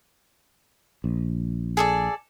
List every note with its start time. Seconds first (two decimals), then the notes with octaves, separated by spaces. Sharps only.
1.04 A#1
1.77 G#4 A4 D5